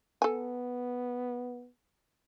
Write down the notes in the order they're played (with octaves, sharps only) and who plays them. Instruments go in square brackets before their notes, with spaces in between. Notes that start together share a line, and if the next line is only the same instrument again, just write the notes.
[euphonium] B3 [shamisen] A4 G#5